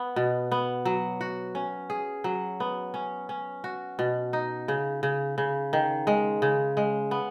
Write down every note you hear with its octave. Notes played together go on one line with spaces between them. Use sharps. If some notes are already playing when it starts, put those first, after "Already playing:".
Already playing: B3
B2
B3
F#3
F#4
C#4
G#4
F#3
B3
C#4
C#4
F#4
B2
D#4
C#3
C#3
C#3
D#3
G#3
C#3
G#3
B3